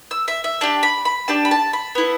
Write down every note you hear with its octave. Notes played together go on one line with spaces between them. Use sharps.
E6
E5
E5
D4 G4 A5
B5
B5
D4 G4 A5
B5
A5
B5
B3 E4 A4